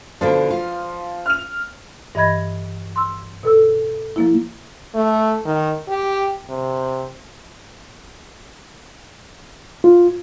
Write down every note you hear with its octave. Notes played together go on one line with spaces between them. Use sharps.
B2 D3 F3 D4
F4
F6 F7
G2 E3 D#5 B5 G#6 A#6
C6 E6
B2 A4 E6
F3 A#3 E4
A3
D#3
G4
C3
F4